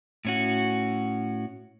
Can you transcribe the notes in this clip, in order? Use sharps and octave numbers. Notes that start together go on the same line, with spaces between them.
A2 C#4 F#4